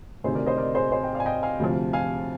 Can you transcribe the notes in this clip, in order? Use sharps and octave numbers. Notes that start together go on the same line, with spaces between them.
D2 C3 D#3 G#4 C5
A#4 D5
C5 D#5
A#4 D5
G#4 C5
G#4 C5
D#5 G5
D5 F5
G#5
D#5 G5
F5 G#5
D2 C3 F3
F5 G#5